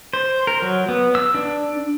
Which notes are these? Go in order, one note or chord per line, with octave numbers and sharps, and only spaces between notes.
C5
A#4
F#3
B3
E6
D4